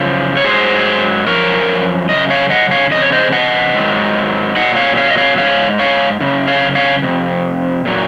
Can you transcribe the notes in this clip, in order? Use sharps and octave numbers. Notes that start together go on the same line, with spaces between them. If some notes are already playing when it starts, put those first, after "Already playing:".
Already playing: F#2 C#3 F3
C#5
G#2 F#3 G#4 C5
F#2 C#3 F3 A#4 C#5
F#2 C#3 D#5
C#5 F5
D#5 F#5
C#5 F5
F2 C#3 D#5
C#5
C5 D#5
D#5 F#5
G#2 D#3 F#3
A#2 F#3 D#5 F#5
C#5 F5
C#5 F5
D#5
C#5 F5
G#2 F3 C#5 F5
C#5 F5
F#2 C#3
C#5 F5
C#5 F5
F2 C3
A#2 F#3